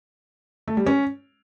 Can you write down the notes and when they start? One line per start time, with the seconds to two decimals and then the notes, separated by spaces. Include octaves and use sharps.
0.68 A3
0.77 G3
0.86 C#4